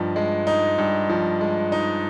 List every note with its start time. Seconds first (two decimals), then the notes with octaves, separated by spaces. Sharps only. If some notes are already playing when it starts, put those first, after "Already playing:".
Already playing: G2 F3 D#4
0.16 G#3
0.47 D#4
0.78 G2
1.09 F3
1.41 G#3
1.72 D#4